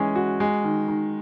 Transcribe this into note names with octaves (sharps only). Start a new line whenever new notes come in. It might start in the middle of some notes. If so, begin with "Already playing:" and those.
Already playing: E3 G#3 C#4
F#4
G#3
D#3
D#3